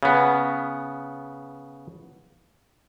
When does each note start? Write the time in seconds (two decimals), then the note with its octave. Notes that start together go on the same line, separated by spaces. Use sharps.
0.03 C#3 B3